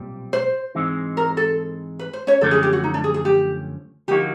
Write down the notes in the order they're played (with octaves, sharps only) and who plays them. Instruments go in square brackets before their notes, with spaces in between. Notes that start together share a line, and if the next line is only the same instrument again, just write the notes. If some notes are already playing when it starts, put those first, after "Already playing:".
Already playing: [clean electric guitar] B1 A#2 G3 C4
[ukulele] C5
[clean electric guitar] G#2 E3 G#3 C4 D#4
[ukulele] A#4
A4
B4
C5
C#4 C#5
[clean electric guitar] F#2 D3 F3 A3 C#4 [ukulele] A4
[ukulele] G#4
G4
F#4
D#4
D4
G#4
G#4
G4
[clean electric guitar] D3 F3 A#3 D#4 F#4 [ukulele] G4